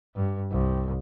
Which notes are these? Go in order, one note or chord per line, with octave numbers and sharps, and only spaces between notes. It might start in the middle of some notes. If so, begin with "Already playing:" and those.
G2
C2